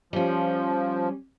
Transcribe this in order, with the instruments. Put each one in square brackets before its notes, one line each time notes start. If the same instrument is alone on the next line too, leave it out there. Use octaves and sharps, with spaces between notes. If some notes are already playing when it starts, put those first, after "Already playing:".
[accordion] F3 [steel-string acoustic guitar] G3 C#4